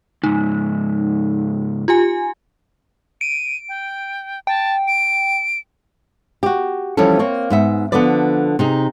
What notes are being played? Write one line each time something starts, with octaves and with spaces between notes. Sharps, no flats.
C#2 G#2 D#4
F4 G4 G#5
D7 D#7
G5
G5 A5
D7
F#4 G4
E3 F3 G3 C#4 E4 A4
A#3 C4 C#5
G#2 B3 E5
D3 F3 B3 A4 B4 D5
C3 D#4 G#4